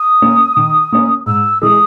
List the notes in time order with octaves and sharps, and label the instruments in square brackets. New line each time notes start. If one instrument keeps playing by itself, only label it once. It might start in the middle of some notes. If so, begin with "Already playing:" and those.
Already playing: [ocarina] D#6
[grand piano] A#3 C#4
D#3
A#3 C#4
[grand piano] G#2 [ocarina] E6
[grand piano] E3 G#3 [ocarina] D#6